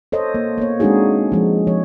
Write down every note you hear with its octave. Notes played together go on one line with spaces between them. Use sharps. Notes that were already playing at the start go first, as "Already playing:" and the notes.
A4 C5 C#5 D#5
A#3
A#3 B3 C#5
G#3 C4 D4 D#4 F#4 G#4
F3 G#3
F3 C#5